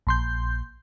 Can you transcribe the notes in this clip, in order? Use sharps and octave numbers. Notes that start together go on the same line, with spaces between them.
A#1 C6 G6